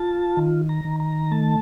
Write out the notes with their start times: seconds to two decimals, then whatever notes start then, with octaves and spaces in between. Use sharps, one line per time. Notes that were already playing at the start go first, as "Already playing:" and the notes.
Already playing: F4 A5
0.37 D#3
0.69 A#5
0.85 D#3
1.00 A#5
1.31 A3 A5